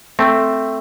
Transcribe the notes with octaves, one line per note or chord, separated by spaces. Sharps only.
A3 C4